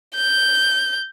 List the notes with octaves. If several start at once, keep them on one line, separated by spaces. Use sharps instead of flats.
G6